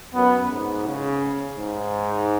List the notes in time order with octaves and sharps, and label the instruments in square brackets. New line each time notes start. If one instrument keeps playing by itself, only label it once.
[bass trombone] F#2 [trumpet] B3
[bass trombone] G#2
C#3
G#2